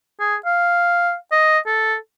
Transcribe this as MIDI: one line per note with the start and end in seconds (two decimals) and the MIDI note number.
0.20 0.36 68
0.46 1.15 77
1.32 1.58 75
1.66 1.96 69